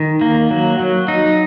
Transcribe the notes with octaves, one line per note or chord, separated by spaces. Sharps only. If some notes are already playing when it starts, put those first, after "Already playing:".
Already playing: D#3
A#3
F#3
F#3
D#4